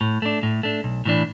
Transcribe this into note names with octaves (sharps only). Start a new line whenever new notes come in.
A2
A3 D4
A2
A3 D4
B1
A2 E3 D4